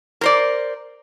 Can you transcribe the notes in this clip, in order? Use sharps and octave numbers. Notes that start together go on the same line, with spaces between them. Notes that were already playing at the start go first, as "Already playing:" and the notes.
A#4 C5 D5